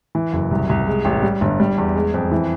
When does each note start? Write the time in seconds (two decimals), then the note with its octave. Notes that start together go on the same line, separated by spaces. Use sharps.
0.15 E3
0.33 F#1
0.51 C2
0.69 C2
0.87 G#3
1.05 A1
1.23 G3
1.41 G1
1.60 G3
1.78 E2
1.95 G#3
2.14 F2
2.31 E3